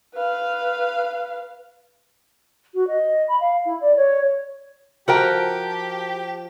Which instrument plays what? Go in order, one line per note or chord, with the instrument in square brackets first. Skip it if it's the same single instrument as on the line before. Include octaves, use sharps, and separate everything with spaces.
[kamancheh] B4 F5
[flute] F#4
D#5
B5
F5
E4
D5
C#5
[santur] F3 [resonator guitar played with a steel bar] F#4 A#4 G5 [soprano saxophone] G4